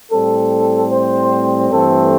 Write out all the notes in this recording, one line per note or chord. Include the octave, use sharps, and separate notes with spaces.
A2 G3 C4 A4
C5
G2 E3 A3 C4 A4